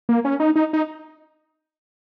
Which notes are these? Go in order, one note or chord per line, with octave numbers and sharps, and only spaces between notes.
A#3
C#4
D#4
D#4
D#4